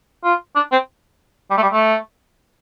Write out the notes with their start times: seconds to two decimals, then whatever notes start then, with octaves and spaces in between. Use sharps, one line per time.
0.24 F4
0.56 D4
0.72 C4
1.51 G3
1.58 A3
1.62 G3
1.73 A3